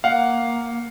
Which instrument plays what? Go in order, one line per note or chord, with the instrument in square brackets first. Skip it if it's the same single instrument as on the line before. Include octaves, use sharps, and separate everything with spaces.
[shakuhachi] A#3 [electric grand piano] F5 F#5